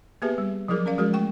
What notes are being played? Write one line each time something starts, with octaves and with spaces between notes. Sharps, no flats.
A#3 B3 G4 G#4 B4 E5
G3
F3 F#3 E4 G#4 A#4
C#4 A#4 D5 F5
F3 G#3 F#4 G#4 A#4
A3 G5 C#6